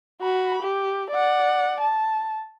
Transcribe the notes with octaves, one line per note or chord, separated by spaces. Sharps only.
F#4 B5
G4
D5 F#5
A5